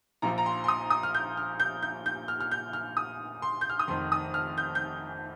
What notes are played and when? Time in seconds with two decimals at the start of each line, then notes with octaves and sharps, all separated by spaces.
0.22 A#1 A#2 F3 A#5
0.38 A#5
0.46 C6
0.64 C6
0.68 D#6
0.90 D#6
1.03 F6
1.14 G6
1.37 F6
1.60 G6
1.82 G6
2.06 G6
2.28 F6
2.40 F6
2.51 G6
2.73 F6
2.97 D#6
3.42 C6
3.61 G6
3.70 F6
3.79 D#6
3.88 F1 F2 D#3 C6
4.12 D#6
4.34 F6
4.58 G6
4.75 G6